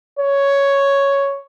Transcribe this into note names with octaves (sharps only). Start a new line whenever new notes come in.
C#5